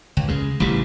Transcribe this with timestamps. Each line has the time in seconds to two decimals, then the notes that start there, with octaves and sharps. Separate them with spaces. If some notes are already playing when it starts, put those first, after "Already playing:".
0.17 C#2
0.28 C#3 G#3
0.60 A1 C#3 E3 G3